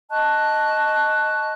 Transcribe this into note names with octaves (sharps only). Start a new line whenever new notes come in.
D#5 A5 C#6 F#6